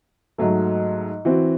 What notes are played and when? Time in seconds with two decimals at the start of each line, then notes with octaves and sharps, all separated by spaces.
0.38 G#2 F#3 A3
1.25 E3 C4 F#4